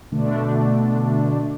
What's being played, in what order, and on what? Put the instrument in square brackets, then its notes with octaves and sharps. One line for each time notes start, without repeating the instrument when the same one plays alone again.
[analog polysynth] B2 D3 A3 D4